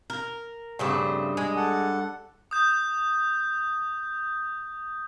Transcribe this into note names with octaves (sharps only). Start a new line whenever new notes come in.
A#4
G2 C#3 A3 C4
G#3
A4 F#5
D#6 G6